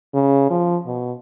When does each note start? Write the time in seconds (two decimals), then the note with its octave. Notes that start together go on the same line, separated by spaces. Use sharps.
0.14 C#3
0.50 F3
0.86 B2